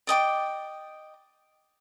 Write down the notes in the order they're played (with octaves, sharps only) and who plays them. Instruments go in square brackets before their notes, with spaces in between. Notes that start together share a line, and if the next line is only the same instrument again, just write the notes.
[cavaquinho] D5 D#5 G5 D6